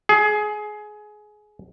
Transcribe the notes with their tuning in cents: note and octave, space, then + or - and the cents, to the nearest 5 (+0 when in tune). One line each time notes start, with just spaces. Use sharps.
G#4 +20